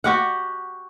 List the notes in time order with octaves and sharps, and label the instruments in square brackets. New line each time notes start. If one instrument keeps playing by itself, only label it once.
[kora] F#4 G4 F#5